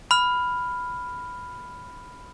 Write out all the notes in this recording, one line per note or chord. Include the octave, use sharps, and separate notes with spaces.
B5 F6